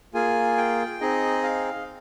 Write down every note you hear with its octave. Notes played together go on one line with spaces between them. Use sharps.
A#3 F4 G#4 G#5
G5
C4 D#4 G#4 D#5
F5